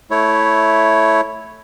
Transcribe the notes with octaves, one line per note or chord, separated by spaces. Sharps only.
A3 E4 C#5